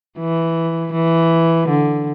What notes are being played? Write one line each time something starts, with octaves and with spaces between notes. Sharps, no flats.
E3
E3
D3